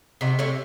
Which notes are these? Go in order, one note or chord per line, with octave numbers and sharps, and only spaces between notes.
C3 D#4 F#4
C3 A3 C#4